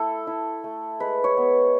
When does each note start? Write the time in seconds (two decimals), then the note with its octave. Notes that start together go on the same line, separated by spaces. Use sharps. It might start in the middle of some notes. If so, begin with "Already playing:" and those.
Already playing: A3 E4 A4
0.27 E4
0.64 A3
1.00 G#3 B4
1.24 C#5
1.37 B3